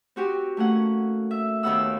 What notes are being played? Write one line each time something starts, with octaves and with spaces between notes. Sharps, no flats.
C4 F#4 G4
A3 A#3 C#4 F#5
E5
D#2 D#3 B3 F#5 E6